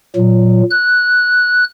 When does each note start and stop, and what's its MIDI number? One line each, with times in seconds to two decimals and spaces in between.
0.16 0.62 46
0.16 0.62 54
0.70 1.64 90